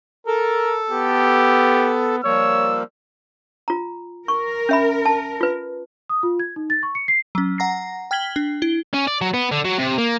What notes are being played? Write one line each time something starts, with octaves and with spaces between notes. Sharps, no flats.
A4 A#4
B3 G4
F3 G3 A#3 C#5 E6
F4 A#5
A#4 C#6
C#4 E5 B5
A5
F4 B4
D#6
F4
G#6
D#4
A6
C#6
C#7
C7
F#3 C#4
F#5 A#5 A#6 C7
G5 F6 G#6 B6 F#7 G7
D4
E4 G7
C#4
D5
F#3
B3
D3
F#3
C3
A#3